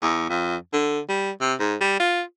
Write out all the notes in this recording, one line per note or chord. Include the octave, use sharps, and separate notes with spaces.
E2
F2
D3
G3
C3
G#2
G3
F4